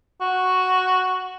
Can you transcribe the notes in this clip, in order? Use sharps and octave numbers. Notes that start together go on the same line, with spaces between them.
F#4